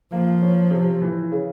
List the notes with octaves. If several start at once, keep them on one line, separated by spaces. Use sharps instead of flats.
F3 A#3
C#4
C3
E3
C#3